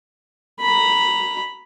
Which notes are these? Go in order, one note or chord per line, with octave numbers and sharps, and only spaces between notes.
A#5 B5